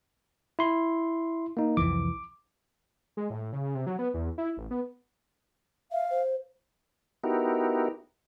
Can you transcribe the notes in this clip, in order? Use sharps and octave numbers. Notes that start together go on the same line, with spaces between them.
E4 C6
A#3 D#4
C2 F2 E3 D6
G#3
A2
C#3
C3
F#3
B3
E2
E4
A1
B3
E5 F5
C5
B3 D#4 E4 F#4 G4 A#4